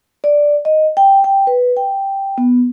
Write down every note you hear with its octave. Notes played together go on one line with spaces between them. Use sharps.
D5
D#5
G5
G5
B4
G5
B3